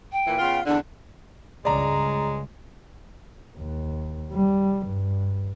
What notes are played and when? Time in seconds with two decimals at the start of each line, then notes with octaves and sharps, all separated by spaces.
0.12 G5
0.26 A#2 E3
0.39 C#3 B3 F4
0.66 E2 D3 D4
1.65 C#2 G2 C#3 G#3 D5 A#5
3.57 D#2
4.33 G3
4.87 G2